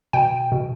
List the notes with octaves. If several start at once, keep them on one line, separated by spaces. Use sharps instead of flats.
B2 G5
B2